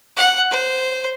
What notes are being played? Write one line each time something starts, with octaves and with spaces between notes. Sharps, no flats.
F#5
C5